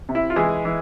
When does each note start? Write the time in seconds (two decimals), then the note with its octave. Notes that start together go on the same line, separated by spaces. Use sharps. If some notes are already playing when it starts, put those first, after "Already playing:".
0.09 C3
0.15 E4
0.30 F4
0.36 E3 G#3 G#4
0.65 E3